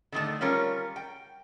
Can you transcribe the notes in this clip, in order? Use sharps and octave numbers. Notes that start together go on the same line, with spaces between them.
D3 D#3 A3
G3 C#4 F4 A#4 C#5
G5